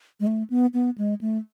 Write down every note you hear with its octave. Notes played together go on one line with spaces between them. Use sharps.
G#3
A3
B3
B3
G#3
A3